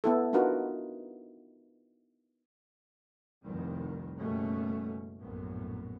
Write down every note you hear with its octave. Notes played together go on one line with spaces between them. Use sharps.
B3 E4 A4
D4 D#4 F4 F#4 A#4 B4
F1 C2 D#3 G3
F#1 B2 G3 A3 C#4
A#1 F#2 A2 B3